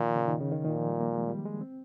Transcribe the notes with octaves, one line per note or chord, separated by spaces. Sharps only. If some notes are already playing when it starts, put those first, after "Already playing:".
Already playing: A#2 D#3 F3
C#3
D#3
C#3
D#3
A#2 D#3
F3
G3
A#3
G#3
G3
G#3
C4